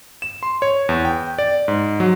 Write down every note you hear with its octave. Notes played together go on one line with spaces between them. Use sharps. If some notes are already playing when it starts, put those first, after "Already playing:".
E7
C6
C#5
E2
G5
D5
G#2
F#3